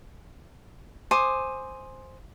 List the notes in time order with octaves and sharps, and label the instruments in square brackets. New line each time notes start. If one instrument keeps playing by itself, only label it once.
[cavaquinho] C5 G#5 D6 D#6